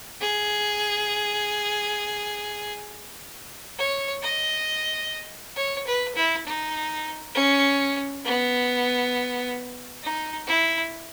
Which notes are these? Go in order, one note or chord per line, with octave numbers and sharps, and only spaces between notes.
G#4
C#5
D#5
C#5
B4
E4
D#4
C#4
B3
D#4
E4